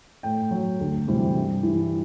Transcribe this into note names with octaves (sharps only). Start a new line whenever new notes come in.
A2 G5
F#3
D2
C3 E3 G3
G2
E3 G3